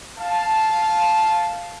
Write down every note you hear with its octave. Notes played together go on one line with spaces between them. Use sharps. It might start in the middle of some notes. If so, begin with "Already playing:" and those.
F5 A5